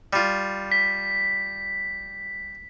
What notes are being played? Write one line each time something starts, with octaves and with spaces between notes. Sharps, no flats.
G3 F4
B6